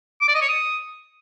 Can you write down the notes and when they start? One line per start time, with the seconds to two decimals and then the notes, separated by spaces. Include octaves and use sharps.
0.21 D6
0.28 D5
0.35 D#5
0.42 C#5
0.48 D#6